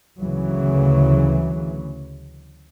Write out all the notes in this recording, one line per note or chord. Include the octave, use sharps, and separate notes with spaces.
D2 C#3 E3 F#3